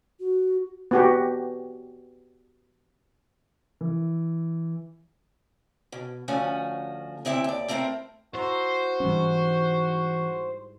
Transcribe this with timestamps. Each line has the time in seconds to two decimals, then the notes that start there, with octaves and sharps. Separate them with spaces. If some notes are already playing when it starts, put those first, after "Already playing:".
0.20 F#4
0.91 B3 F#4 G4
3.81 E3
5.92 B2
6.28 D2 F3 A3 C#4 F#4 G#5
7.25 D2 C4 E4 E5
7.44 D#2 D5
7.68 A3 C4 E4 A#4 C5
8.34 E4 F#4 C5 A#5
9.00 G#2 E3 G3 C#4